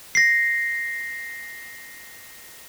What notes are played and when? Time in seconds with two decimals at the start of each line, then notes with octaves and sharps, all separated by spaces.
0.15 A#6 C7